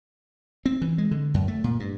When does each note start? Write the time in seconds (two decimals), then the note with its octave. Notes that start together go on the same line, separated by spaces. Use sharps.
0.66 C4
0.82 E3
0.98 G#3
1.11 D3
1.34 F#2
1.48 A3
1.64 A#2
1.80 G2